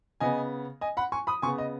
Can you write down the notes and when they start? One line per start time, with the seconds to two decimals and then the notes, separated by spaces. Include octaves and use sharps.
0.20 C#3 B3 D#5 G#5
0.81 D#5 G#5
0.97 F#5 B5
1.12 G#5 C#6
1.27 B5 D#6
1.42 C#3 B3 G#5 C#6
1.58 D#5